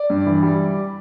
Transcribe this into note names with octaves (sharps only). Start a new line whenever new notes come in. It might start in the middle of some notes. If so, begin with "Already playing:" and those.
Already playing: D5
G2
E3
G3